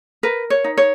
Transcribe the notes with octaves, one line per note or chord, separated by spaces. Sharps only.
A#4 B4
C#5
D#4
C#5